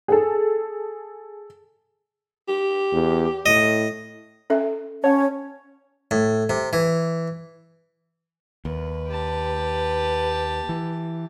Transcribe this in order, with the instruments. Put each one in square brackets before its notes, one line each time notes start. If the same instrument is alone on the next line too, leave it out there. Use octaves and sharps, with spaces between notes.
[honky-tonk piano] G#4 A4
[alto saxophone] G4
[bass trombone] E2
[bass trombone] A2 [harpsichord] D#5
[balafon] C#4 A4 E5
[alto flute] C#4 [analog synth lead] C#5 [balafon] F#5 A5
[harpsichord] A2
C3
E3
[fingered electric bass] D#2 [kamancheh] B4
[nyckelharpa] G4 A5
[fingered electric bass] E3